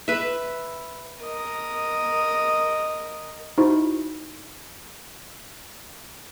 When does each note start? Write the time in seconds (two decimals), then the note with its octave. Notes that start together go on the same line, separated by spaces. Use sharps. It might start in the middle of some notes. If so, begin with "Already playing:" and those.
0.08 B4 E5
1.22 A#4 D#5
3.58 D#4 E4 F#4 C5